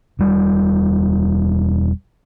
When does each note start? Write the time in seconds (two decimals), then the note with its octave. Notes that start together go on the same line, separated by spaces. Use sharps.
0.19 E1 G3